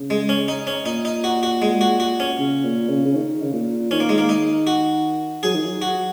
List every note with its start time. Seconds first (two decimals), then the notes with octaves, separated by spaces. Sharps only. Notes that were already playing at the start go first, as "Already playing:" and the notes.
Already playing: C#3
0.10 G#3
0.29 C#4
0.48 D#4
0.67 C#4
0.86 A#2 D#4
1.05 D#4
1.24 F#4
1.43 F#4
1.62 G#3
1.81 F#4
2.00 F#4
2.20 C#4
2.39 C#3
2.65 A#2
2.89 C#3
3.05 C#3
3.15 D#3
3.42 C#3
3.53 A#2
3.91 D#3 C#4
4.00 A#3
4.09 G#3
4.18 A#3
4.29 D#4
4.67 F#4
5.43 F#3 G#4
5.55 D#3
5.65 F#3
5.82 F#4